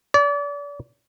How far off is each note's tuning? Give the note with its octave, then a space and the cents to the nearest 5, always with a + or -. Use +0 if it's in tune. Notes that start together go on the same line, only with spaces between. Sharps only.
D5 -35